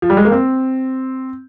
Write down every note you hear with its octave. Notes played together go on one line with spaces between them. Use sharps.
F3
G3
G#3
A#3
C4